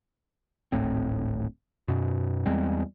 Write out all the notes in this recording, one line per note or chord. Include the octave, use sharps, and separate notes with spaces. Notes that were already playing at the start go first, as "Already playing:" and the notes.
D1 G#1 A2 C4
F#2 B2
E2 G3 G#3 C4